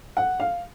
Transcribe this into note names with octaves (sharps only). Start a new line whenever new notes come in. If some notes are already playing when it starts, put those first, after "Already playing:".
F#5
F5